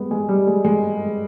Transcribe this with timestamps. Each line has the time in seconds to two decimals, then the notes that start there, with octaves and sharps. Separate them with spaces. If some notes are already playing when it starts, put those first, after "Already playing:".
Already playing: G3 G#3 B3
0.11 G#3
0.29 G3
0.47 G#3
0.64 G#3